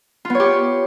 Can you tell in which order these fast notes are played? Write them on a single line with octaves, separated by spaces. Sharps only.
F4 B3 C#5 G4